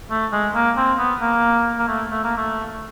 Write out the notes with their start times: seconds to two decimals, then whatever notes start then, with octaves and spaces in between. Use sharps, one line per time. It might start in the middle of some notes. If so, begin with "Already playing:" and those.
0.10 A3
0.32 G#3
0.54 A#3
0.77 C4
0.98 B3
1.21 A#3
1.79 A#3
1.88 A3
2.11 A3
2.24 A#3
2.37 A3